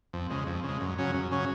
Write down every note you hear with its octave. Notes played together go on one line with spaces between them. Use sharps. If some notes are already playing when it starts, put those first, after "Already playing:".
F2
C#3 G#3
F2
C#3 G#3
F#2
C#3 F#3 C#4
F#2
C#3 F#3 C#4